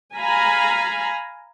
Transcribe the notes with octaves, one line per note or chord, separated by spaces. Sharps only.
F5 G#5 A#5 B5